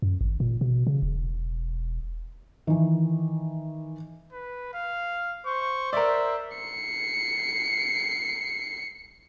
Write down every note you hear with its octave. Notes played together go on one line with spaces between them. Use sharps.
F#2
G#1
A#2
B2
C#3
E1
D#3 E3
B4
F5
C5 C#6
A#4 D5 E5
C7 C#7